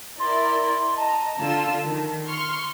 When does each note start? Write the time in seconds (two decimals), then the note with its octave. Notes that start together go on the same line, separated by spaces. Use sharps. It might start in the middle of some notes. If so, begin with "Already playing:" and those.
0.20 E4 A#4 D5 C6
0.97 D#5 A5 A#5
1.37 D3 F4 E6
1.84 D#3
2.28 C6 C#6 F6